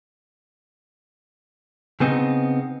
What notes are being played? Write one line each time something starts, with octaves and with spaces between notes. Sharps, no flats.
C#3 B3 C4 D4 D#4